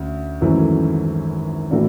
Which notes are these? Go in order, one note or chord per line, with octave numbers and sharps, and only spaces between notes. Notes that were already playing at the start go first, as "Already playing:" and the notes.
Already playing: D2 C#4
G#1 F#2 E3 A3 C#4
A2 E3 A3 D4 F#4